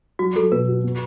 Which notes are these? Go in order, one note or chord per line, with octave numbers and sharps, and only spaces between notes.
F#3 F#4
F#3 A4
B2 B4
F#4
B3